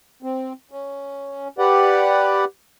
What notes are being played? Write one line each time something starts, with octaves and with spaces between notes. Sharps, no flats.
C4
C#4
G4 B4 D5 F#5